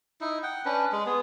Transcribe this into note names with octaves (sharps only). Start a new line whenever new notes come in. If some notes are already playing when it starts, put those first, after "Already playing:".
D#4 E4
F#5 G5
C#4 D4 B4
G#3
B3 G#4